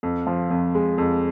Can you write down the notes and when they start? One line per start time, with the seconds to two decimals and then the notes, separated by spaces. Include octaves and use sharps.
0.03 F2
0.27 F3
0.51 F2
0.75 G#3
0.98 F2